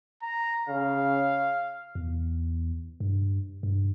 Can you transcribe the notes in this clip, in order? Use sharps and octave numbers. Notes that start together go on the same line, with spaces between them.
A#5
C#3 F5
E2
G2
G2